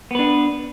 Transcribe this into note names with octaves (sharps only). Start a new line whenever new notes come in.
B3 D4 B4